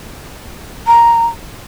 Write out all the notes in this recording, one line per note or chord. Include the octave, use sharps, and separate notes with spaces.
A#5